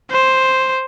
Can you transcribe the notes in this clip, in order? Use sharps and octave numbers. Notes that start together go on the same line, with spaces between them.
C5